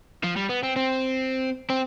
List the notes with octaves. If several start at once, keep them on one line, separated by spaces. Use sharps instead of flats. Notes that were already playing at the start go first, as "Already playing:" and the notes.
F3
G3
B3
C4
C4
C4